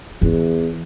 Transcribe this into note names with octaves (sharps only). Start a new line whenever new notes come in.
E2 E3